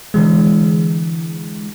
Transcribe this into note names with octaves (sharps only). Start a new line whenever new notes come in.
D3 E3 G#3